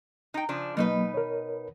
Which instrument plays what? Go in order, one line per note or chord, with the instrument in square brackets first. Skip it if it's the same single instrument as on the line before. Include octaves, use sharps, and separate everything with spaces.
[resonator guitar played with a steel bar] D#4 G5
C#3 F3 D4
[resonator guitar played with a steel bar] B2 D#4 B4 [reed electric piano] F#3 A#3
[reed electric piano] A#4 C#5